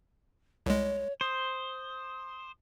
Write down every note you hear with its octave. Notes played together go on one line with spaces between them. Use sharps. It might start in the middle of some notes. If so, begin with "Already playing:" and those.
C2 G#3 C#5
C5 D#6